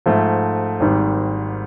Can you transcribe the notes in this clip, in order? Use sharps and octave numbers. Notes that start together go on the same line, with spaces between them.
G#2 F3 A3
G#1 G#2 D#3 G3